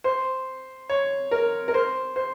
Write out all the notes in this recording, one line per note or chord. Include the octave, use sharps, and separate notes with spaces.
C5
C#5
A#4
A#4
C5
C5